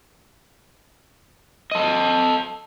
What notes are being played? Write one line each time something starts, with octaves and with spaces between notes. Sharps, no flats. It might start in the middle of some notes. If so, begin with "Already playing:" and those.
A4 D#5